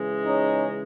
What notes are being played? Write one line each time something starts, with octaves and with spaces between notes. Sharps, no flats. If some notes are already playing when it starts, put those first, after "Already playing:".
Already playing: C#3 E3 G#3
C#4 D#4